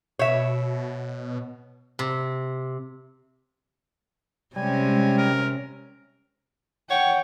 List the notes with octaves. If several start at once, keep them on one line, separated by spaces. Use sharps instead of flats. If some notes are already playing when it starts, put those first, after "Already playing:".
B2 C#5 E5
C3
C3 G3 G#3 C#4 G#5
A#4
C#5 F#5 G5